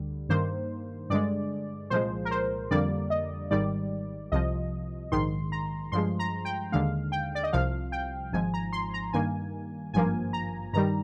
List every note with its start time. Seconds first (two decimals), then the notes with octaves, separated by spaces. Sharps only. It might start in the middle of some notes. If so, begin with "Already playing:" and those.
Already playing: D2 D3 G3
0.29 G2 D#3 A#3 C5
1.10 G2 D3 G#3 D5
1.90 C2 A#2 F3 G#3 C5
2.25 A#4
2.31 C5
2.71 F2 D3 G3 A#3 D5
3.10 D#5
3.51 G#1 G#2 D#3 G3 D5
4.32 C2 C3 F3 D#5
5.12 A#1 G#2 D#3 C6
5.52 A#5
5.92 G2 F3 G#3 C6
6.19 A#5
6.45 G5
6.72 D#2 D3 G#3 F5
7.12 G5
7.35 D5
7.43 D#5
7.53 C2 C3 F3 F5
7.92 G5
8.32 G#1 G#2 F3 G#5
8.54 A#5
8.73 C6
8.94 A#5
9.13 G2 D#3 A#3 G#5
9.94 G#1 G2 F3 A#3 G#5
10.33 A#5
10.73 G2 D#3 G3 A#5